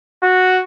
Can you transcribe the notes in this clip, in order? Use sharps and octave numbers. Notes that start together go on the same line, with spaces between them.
F#4